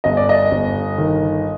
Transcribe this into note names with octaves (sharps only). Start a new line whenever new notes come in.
G1 D#5
D5
D#5
G1
D#3